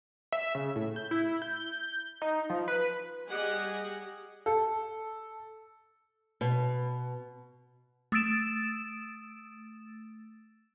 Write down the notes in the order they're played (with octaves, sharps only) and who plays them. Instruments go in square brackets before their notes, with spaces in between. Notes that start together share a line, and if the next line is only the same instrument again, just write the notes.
[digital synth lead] E5
C#3
A2
G6
E4
G6
D#4
F3
B4
[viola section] G3 G4 G#4 D#5 F#5 G#5
[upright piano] A4
[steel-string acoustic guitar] B2
[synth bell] A3 D#6 E6 A6 D7 E7